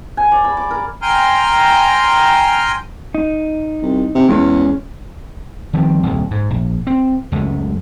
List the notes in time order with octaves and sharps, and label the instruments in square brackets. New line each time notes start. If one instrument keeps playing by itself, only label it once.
[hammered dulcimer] G#5
D5
B5
D6
A#4
[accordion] G5 G#5 A#5 C6 F6
[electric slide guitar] D#4
[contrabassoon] C2
C3
[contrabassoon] E2 [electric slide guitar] G#3 C#4
[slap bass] D#3 F3 G3 C4
D#1 C2
G#2
A#1
C4
C#2 F#2 G#3 A3